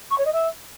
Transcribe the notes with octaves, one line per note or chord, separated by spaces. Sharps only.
C#6
C#5
D#5
E5